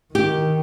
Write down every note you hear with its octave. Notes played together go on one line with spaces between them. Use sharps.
D#3 G4